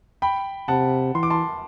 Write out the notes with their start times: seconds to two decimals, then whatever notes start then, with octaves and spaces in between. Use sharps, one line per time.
0.22 G5 B5
0.68 C3 F#5 A5
1.14 E3 C6
1.23 D6
1.30 A5 C6